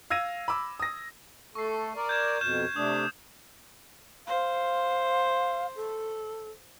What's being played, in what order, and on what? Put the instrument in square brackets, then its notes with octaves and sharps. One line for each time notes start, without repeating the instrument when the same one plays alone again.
[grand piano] F5 E6 G#6 A#6 D#7
B5 D6 E6
D#6 A#6
[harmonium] A3 A4 [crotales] C#6 C7
[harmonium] A#4 D5
[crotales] G6 G#6 E7
[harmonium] F2 B2 [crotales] F6 G6 E7
[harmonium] C3 A3 D4 [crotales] D#6
[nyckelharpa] C5 [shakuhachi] F5
[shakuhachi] A4